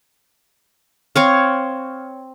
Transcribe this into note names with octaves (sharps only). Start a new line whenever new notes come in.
C4 C#5 F5